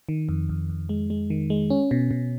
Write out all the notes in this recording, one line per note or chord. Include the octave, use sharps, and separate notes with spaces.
D#3
F2
F2
F2
G#3
G#3
D#3
G#3
C#4
B2
B2